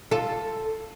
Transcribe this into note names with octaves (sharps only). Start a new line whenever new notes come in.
F4 A4